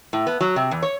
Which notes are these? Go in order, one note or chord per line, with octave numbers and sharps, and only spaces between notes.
A2
B3
F#3
C3
E2
C#5